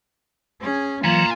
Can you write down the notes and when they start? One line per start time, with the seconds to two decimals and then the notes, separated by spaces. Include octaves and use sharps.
0.60 C#4 G#4
1.04 E3 F#3 A#3 F4 G#5 A#5